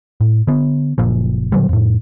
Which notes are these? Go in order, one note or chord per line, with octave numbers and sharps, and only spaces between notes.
A2
D3 B3
F#1 A#2 F3
A#2 D3 F#3 G3
F2 A2